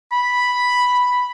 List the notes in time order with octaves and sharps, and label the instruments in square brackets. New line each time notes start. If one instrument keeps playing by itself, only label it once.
[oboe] B5